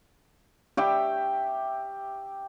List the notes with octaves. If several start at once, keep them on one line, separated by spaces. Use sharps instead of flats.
G4 E5 G5